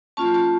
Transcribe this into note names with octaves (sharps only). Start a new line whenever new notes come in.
A#3 C#4 F4 A5 C#6
A5 C#6